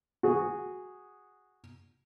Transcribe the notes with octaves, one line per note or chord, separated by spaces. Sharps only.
F#4 G#4